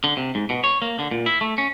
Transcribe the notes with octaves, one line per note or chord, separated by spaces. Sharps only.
D3
C3
G#2
B2
C#5
A#3
D3
A#2
E4
A3
C#4